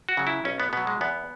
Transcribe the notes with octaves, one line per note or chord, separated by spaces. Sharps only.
F#4
C#3 F#3
E4
B1 C#4
B3
B2 F#3 B3
G#3
E2 B3